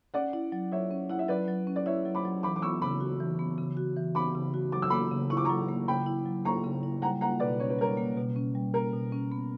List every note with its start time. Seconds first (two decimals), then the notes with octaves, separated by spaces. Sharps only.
0.14 C#4 D5 F#5
0.33 E4
0.52 F#3
0.72 F#3 C#5 E5
0.91 C#4
1.10 E4 F#5
1.19 E5
1.29 F#3 B4 D5
1.48 F#3
1.67 C#4
1.76 D5
1.86 E4 C#5 E5
2.05 F#3
2.15 B5 D6
2.25 F#3
2.43 E3 B5 D6
2.56 D6
2.62 B3 C#6 E6
2.82 C#3 B5 D6
3.01 F#4
3.20 E3
3.39 B3
3.58 C#3
3.77 F#4
3.96 E3
4.15 B3 B5 D6
4.35 C#3
4.54 F#4
4.72 F#3 D6
4.82 E6
4.90 A#3 B5 D6
5.11 C#3
5.30 E4 C#6
5.37 D6
5.45 F#3 A#5 C#6
5.69 A#3
5.88 C#3 G5 B5
6.06 E4
6.25 F#3
6.45 A#3 A#5 C#6
6.64 C#3
6.83 E4
7.02 G3 F#5 A#5
7.21 A#3 F#5 A#5
7.40 B2 B4 D5
7.60 C#4 C#5
7.70 B4
7.79 G3 A#4 C#5
7.97 A#3
8.17 B2
8.36 C#4
8.55 G3
8.74 A#3 A#4
8.93 B2
9.12 C#4
9.32 B3